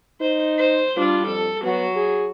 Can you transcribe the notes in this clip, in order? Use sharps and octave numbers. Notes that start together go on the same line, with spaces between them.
D#4 C5
C5
G3 D4 F4
F2 A4
F#3 B3 F#4
G#4